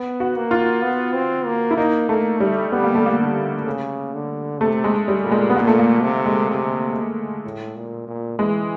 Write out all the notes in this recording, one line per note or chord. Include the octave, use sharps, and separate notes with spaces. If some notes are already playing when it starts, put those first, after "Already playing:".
Already playing: B3
F#4
A#3
F4
B3
C4
A#3
E4
A#3 D#4
A3 A#3
G3 A3
G3 B3
A#3
A3
A#3
D3
C#3
D3
C3 A3
G#3
G3
A#2
G#3
B3
A#2 A#3
A3
A#3
C3
G#3
C3
A2
A#2
A#2
E3 G#3